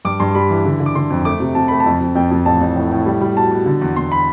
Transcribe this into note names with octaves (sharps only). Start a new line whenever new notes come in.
G2 D6
G2 C6
G3 B5
E3
D3
D3
D6
D3 C6
F2
A3 D6
C3
C3 A5
A3 B5
A5
F2
F2
F2 G5
F2
A1 A5
A1
A2
A2
G3
G3
B2 A5
B2
D3
E2
E2 C6
B5